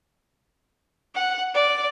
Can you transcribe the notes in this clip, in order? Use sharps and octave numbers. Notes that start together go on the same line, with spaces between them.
F#5
D5